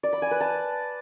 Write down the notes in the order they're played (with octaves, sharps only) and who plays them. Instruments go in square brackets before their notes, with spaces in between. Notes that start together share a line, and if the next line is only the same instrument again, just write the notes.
[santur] D5
B5
G#5
B4
A5